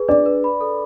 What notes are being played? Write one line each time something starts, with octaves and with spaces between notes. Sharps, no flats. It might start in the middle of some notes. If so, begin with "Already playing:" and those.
Already playing: G#4 B4
D4 D5
B4
B5
A4